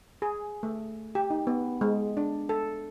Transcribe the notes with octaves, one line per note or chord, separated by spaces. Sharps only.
G#4
A3
G4
D#4
B3
G#3
D4
A4